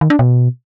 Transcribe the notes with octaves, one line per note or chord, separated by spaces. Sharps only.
D#3
D4
B2